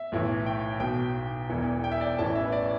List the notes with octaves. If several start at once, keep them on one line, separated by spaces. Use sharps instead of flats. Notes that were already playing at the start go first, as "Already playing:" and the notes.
Already playing: E5
B1 A2 E3
G5
B1 B2 G5
E1 E2 E3
G5
E5
D5
A1 A2 E3 A5
E5
B4
D5